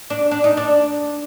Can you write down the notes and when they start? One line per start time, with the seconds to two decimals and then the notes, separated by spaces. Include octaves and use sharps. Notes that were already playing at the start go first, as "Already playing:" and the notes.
0.10 D4
0.31 D4
0.44 D#4
0.57 D4